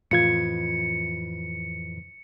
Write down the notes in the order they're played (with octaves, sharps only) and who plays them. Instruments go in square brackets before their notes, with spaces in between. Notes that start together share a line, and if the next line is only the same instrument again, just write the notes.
[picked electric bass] F2 E3 [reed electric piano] A2 F4 G#6 [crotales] C#7